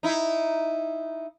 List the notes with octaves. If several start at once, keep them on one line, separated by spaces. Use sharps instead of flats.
D#4 E4